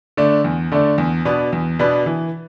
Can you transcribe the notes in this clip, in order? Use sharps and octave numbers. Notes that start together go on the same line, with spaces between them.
D3 A3 D4
E2
D3 A3 D4
E2
B2 B3 D4 B4
E2
B2 B3 D4 B4
E3